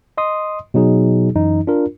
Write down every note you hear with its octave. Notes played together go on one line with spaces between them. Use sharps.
D#5 C6 D#6
B2 F#3 D#4 G#4
F#2 E3 D#4
D4 F4 A#4